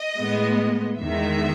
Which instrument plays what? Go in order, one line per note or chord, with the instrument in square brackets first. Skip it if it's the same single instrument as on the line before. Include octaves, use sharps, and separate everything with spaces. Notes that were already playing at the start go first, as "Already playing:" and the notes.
Already playing: [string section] D#5
A2 G#3 B3
E2 D#3 G#3 E5